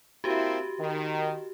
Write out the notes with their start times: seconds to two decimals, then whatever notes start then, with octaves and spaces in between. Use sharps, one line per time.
0.24 A#3 C4 E4 F#4 G4
0.79 D#3